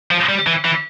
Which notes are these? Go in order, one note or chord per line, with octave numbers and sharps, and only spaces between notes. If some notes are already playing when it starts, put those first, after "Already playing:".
F3
G3
E3
E3